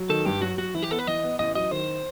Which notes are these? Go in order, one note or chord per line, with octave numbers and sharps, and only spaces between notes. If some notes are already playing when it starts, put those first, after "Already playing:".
Already playing: F#3
D#3 A4
G2 G4
F#3 F#4
F#3 F#4
E3 E4
G4
B3 A4
B4
E3 D#5
B3
A1 D#5
F#3 D#5
D#3 C5